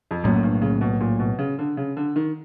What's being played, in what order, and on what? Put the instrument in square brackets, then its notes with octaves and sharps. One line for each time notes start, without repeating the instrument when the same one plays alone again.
[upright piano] F2
[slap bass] B1 A2 F#3 A#3 [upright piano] F#2
[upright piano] G2
C#3
B2
A#2
B2
C#3
D3
C#3
D3
D#3